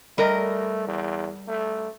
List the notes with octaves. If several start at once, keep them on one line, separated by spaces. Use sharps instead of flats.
G3 A3 A#4 D#5
E2
A3